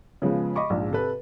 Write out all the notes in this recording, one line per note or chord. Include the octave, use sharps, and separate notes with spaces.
C#3 F3 G#3 B3
D#5 B5 C#6 D6
A#1 G#2 F3
C3 A4 B4